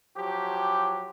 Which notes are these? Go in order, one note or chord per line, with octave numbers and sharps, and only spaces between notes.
F3 F#3 G4